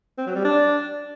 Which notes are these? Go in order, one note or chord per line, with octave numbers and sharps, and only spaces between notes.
C4
F#3
G3
D4